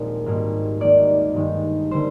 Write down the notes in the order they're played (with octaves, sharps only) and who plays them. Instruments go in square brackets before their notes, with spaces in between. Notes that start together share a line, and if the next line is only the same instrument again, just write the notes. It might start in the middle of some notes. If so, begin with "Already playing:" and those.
Already playing: [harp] A#1 D#2 A#2 G#3 C4 A#4
G#1 G#2 G3 A#3
D#2 D#3 A#3 D5
G2 D#3 G#3
D3 G3 A#3 C5